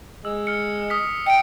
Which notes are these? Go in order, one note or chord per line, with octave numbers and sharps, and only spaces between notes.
G#3 E6
F6 C#7
D#6 F6 B6
D#5 G5 C#7 D7